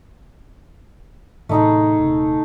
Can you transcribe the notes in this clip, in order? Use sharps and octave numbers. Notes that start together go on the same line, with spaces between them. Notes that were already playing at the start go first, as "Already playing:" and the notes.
A2 C3 E3 A3 D#4 G#4
D#1 C3